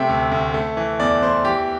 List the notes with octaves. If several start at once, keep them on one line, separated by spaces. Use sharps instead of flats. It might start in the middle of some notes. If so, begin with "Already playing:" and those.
Already playing: C3 A3 E5 G5
D2
D2
A3
E3
E2 D5
E2 C5
E3 G4